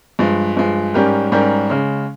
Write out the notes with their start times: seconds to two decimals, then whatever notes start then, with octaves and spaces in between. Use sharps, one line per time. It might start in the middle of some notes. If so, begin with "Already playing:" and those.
0.19 G2 F3 G#3
0.57 G2 F3 G#3
0.94 G#2 G3 C#4 G4 A#4
1.32 G#2 G3 C#4 G4 A#4
1.69 C#3 G#3 C#4